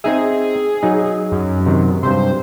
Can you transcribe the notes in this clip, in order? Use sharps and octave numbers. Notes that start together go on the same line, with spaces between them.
C4 D#4 G#4 E5
F#3 D#4
F#2
C3 D#3
G2 C3 C5